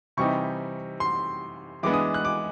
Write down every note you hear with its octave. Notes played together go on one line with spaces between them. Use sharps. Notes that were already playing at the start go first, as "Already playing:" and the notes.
C3 E3 G3 C4 D#4 C#6
C6
E3 G#3 B3 D4 D6
D#6
F#6
D6